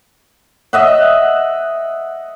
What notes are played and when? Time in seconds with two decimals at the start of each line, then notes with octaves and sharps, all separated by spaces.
0.73 D#5 E5 F#5